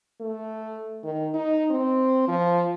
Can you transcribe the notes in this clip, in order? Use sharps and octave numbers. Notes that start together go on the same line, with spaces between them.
A3
D#3
D#4
C4
F3